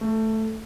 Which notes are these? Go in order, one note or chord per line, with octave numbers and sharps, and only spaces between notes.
A3